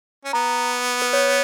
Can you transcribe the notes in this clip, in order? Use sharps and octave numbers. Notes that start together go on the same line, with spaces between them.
C#4
B3 A#5
B4
C#5